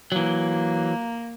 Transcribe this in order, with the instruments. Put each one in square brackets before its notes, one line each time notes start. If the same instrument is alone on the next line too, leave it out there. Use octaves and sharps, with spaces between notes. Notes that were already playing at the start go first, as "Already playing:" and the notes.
[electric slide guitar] E3 F#3 [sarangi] A#3